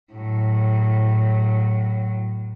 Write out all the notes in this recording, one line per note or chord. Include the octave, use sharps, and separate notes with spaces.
A2 F#3